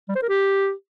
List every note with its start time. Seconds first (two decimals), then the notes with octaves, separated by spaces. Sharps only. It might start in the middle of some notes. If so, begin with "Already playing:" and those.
0.09 G3
0.16 C5
0.22 A#4
0.29 G4